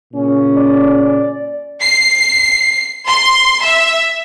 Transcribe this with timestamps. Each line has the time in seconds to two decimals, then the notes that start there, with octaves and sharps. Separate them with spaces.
0.13 A#2 C#3 C#4
0.56 D5
1.81 C7
3.06 C6
3.62 E5